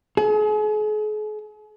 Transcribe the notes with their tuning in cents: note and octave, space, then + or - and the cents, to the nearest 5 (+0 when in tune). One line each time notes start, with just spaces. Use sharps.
G#4 +40